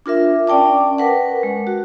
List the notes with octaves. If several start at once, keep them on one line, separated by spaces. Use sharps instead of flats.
D4 F4 A#4 E5
C#4 D5 G5 A5 D6
A#4 B4 F#5
G#3
F#4